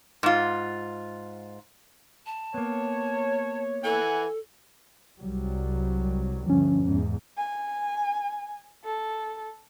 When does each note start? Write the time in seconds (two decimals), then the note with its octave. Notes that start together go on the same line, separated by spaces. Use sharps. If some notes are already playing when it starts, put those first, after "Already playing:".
0.23 G#2 F4
2.26 A5
2.54 A#3 B3 C#5
3.84 E3 A4 F#5 G#5
5.19 C2 F#3 G3
6.47 D2 G2 F3 C#4
6.80 E2 G#2
7.37 G#5
8.84 A4